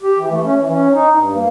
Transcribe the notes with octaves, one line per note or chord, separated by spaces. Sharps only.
G4
E3
A3
C#4
E3
C#4
D#4
G2
A#3